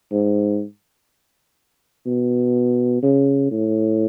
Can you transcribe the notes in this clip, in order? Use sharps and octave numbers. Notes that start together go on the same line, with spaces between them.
G#2
B2
C#3
A2